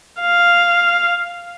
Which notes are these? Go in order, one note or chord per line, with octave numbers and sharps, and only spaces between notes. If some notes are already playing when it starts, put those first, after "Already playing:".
F5